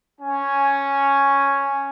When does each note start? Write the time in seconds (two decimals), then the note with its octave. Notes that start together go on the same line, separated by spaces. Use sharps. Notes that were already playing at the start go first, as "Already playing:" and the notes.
0.21 C#4 G#5